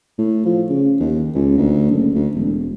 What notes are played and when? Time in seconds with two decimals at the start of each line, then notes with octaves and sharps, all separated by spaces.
0.18 A2
0.45 F3
0.69 C#3
1.00 D#2
1.35 C#2
1.58 D2
1.91 F#1
2.15 D2
2.35 E1